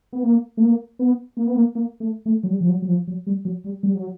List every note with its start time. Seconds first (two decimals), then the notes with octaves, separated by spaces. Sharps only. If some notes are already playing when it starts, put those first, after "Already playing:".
0.13 B3
0.23 A#3
0.57 A3
0.62 A#3
0.99 B3
1.37 A#3
1.47 B3
1.56 A#3
1.75 A#3
2.00 A3
2.26 A3
2.43 F#3
2.50 G3
2.61 F3
2.69 F#3
2.82 F#3
2.88 F3
3.08 F#3
3.27 G3
3.45 F#3
3.64 G3
3.83 G3
3.95 F#3